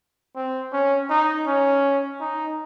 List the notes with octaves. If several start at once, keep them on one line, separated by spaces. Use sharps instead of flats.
C4
C#4
D#4
C#4
D#4